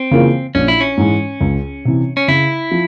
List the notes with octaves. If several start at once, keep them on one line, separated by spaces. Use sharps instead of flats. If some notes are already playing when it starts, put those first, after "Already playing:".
Already playing: C4
C#3 E3 A#3 F4
A#1 C#4
E4
C#4
G#2 E3 G#3
C#2
C3 E3
C#4
C#3 E4
F3